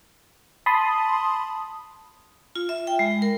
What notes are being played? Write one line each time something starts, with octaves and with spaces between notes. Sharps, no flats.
A5 B5 C6 D#6
F4
E5
G5
G#3
A#4